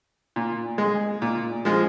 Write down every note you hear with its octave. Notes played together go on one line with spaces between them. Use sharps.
A#2
G#3
A#2
F3 G#3